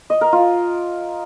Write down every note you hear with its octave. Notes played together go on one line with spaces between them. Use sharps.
D#5
A#4
F4